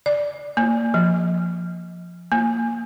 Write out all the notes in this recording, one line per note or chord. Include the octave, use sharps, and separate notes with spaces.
D5
A#3
F3
A#3